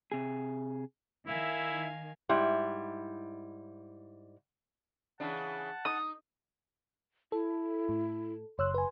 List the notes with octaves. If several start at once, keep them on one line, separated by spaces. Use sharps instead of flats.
C3 G#4
D#3 E4 E5 F5 G#5
G#2 G3 E4
C#3 E3 D4 F#5 A5
D#4 D#6
E4 A4
A2
F#1 C#5 C6 E6 F#6
B4 G#5